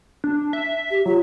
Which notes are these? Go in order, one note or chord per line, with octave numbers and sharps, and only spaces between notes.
D4
E5
G4
F#3 F4